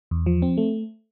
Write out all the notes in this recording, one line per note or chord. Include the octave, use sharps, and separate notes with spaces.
E2
F3
C4
A3